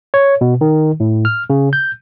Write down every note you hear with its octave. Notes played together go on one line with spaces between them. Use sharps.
C#5
B2
D#3
A2
F6
C#3
G6